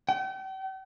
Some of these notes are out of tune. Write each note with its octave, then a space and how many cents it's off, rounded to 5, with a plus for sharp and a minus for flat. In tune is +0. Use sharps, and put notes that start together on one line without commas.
G5 -40